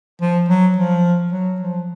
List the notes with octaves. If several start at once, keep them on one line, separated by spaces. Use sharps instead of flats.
F3
F#3
F3
F#3
F3